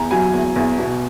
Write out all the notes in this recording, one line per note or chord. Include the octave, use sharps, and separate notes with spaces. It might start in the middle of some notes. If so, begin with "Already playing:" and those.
Already playing: E2 A#5
F#3 G#5
E2
E2
B2